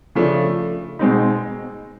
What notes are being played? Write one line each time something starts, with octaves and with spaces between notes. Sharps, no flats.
C#3 F3 A3 D4
B2 G#3 C4 D#4